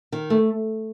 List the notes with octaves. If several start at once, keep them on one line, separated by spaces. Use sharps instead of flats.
D#3
A3